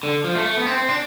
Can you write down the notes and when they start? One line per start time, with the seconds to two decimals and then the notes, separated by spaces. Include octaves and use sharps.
0.03 D3
0.24 F3
0.35 A3
0.45 A3
0.57 B3
0.67 C4
0.78 C4
0.89 D4